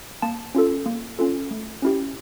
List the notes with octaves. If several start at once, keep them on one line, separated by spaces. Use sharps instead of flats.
A#3 A5
C#4 F4 A4
A#3
C#4 F4 A4
A3
C#4 E4 G4